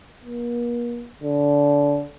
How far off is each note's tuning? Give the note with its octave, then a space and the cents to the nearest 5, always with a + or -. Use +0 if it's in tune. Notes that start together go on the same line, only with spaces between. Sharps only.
A#3 +40
D3 -25